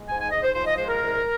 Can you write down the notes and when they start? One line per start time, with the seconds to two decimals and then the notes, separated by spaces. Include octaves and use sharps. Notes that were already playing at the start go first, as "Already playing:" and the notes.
Already playing: G#3
0.08 G#2 G#5
0.21 G#5
0.31 G#2 D#5
0.43 C5
0.55 F3 C5
0.66 D#5
0.78 G#3 C5
0.89 A#4
1.01 C2